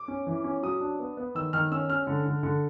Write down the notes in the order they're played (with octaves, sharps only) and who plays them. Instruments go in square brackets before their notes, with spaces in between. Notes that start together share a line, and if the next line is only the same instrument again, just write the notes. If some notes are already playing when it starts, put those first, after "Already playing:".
Already playing: [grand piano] D6
C#4
E3
C#4
F#3 D#6
D4
B3
B3
D#3 E6
D#3 F6
C#4 E6
C#4 F6
D3
D3
D3